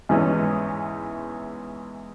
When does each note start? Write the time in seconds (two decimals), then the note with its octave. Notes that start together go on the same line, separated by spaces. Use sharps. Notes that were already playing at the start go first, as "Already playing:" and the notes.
0.09 E2 G#2 E3 G#3 C#4